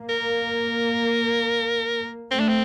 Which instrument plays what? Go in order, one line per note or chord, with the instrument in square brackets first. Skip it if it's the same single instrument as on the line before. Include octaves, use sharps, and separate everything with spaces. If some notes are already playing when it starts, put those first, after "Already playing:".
Already playing: [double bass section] A#3
[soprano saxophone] A#4
[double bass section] A3 [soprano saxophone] C4
[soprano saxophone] D4
C4